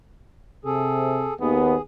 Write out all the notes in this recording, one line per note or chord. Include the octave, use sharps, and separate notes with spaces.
C3 G#4 A4
D#2 B3 G#4